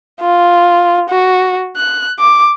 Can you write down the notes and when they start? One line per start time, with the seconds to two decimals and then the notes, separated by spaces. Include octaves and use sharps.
0.21 F4
1.09 F#4
1.76 F#6
2.19 D6